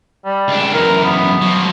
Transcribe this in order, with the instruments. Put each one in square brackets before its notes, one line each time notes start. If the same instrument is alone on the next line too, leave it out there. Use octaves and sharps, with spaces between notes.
[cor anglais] G3
[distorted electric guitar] C#2 D4
[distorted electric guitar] F#2 E3 [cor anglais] A#4
[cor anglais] B3
[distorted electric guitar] F3 F#3